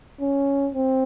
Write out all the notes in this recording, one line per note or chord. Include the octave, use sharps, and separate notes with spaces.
C#4
C4